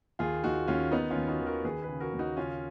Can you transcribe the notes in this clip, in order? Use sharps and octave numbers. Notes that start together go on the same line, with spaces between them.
D#2 F4 G#4
D#2 D#4 F#4
D#2 C#4 F4
D#3 B3 D#4
C#4 F4
D#2
D#4 F#4
D#3
F#4 A#4
D#2 G#4 B4
G#4 B4
C#3
F#4 A#4
D#2
D#4 F#4
C#3 C#4 F4